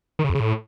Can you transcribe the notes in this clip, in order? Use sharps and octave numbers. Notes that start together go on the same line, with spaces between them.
D#3
C#3
F2
C#3
A2